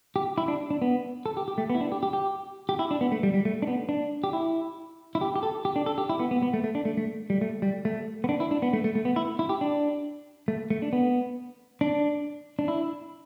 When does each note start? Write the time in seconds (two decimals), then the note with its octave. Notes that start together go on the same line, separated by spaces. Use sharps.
0.16 G4
0.38 E4
0.48 D4
0.71 D4
0.82 B3
1.26 A4
1.37 G4
1.48 G4
1.58 A3
1.70 B3
1.75 E4
1.81 D4
1.92 G4
2.03 G4
2.13 G4
2.69 G4
2.79 E4
2.91 D4
3.01 B3
3.12 A3
3.23 G3
3.34 G3
3.45 A3
3.62 D4
3.67 B3
3.89 D4
4.24 G4
4.33 E4
5.15 E4
5.21 G4
5.36 G4
5.43 A4
5.65 G4
5.76 D4
5.86 A4
5.98 G4
6.09 E4
6.20 B3
6.31 B3
6.43 B3
6.54 A3
6.64 A3
6.75 D4
6.85 A3
6.97 A3
7.30 G3
7.41 A3
7.62 G3
7.85 A3
8.24 B3
8.29 D4
8.40 E4
8.51 D4
8.62 B3
8.73 A3
8.84 A3
8.95 A3
9.05 B3
9.16 E4
9.39 E4
9.49 G4
9.61 D4
10.48 A3
10.70 A3
10.82 D4
10.93 B3
11.81 D4
12.59 D4
12.68 E4